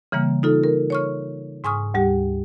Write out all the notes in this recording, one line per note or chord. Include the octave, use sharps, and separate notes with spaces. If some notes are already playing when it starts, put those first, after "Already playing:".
C#3 E3 G3 A#3
D#4 F4 A4
A#4
C#5 C#6 F6
G#2 G#5 C#6 D#6 F6
D2 G3 G4